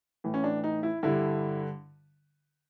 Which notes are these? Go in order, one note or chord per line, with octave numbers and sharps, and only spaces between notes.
A2 E3
C#4
D4
D#4
E4
G2 D3 E4